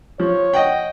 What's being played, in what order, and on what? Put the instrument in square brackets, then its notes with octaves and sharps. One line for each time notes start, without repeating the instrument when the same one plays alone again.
[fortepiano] F3 [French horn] C#5
[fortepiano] D#5 F#5 G5